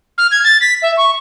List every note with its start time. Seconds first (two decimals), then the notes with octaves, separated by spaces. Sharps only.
0.18 F6
0.31 G#6
0.44 A6
0.61 B6
0.82 E5
0.97 C#6